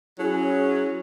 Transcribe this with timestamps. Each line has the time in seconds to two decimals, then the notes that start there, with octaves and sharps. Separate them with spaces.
0.19 F#3 C#4 E4 G#4